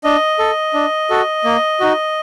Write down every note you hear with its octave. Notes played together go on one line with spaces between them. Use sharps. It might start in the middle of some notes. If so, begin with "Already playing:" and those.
D4 D#5
A4
D4
F#4 A4
A#3
D#4 F#4